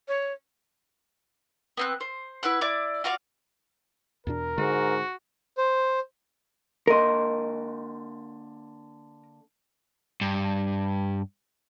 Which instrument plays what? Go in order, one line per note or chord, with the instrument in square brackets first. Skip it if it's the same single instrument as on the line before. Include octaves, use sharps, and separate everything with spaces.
[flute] C#5
[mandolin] B3 C4 F#6
C5
E4 B4 F#5 F#6
E4 D5
F4 F#4 D5 F5
[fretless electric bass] E2 B2 D4 [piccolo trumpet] A#4
[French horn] G#2 [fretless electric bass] D3 G#3 [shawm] F#4
[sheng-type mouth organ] C5
[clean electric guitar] D3 A#3 C6 [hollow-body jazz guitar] A#4 D#5
[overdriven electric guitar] G2